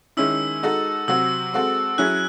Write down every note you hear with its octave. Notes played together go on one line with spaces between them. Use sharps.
D#3 G#3 C#4 E4 E6
G#3 D#4 F#4 A4
C3 F#3 C4 F#4 E6
G#3 C4 F#4 A4
F#3 C#4 E4 G#4 F#6